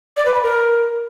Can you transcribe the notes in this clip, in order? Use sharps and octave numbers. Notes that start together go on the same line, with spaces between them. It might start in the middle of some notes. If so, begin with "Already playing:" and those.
D5
B4
B5
A#4